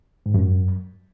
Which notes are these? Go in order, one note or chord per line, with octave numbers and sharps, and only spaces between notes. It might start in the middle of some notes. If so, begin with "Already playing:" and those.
G#2
F#2